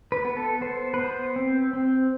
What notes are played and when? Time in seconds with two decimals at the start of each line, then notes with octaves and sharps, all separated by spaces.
0.12 B4
0.24 B3
0.37 A4
0.61 B3 C5
0.94 B4
0.98 B3 C5
1.36 C4
1.73 C4